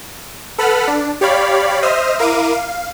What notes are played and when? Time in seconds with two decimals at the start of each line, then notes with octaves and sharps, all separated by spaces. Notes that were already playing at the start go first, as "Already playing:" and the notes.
0.58 A4 B4 F#5 B5 F6
0.88 D4
1.21 G4 C#5 D5 F5 B5
1.82 C5 D#5 E5 D#6 F6
2.19 E4 A#4 F5 D6 D#7
2.53 F5